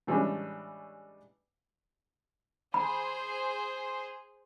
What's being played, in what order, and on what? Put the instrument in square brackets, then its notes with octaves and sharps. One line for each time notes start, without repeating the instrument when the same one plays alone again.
[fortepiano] A2 E3 G3 G#3 C#4 D4
[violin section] G#4 C5 [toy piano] B5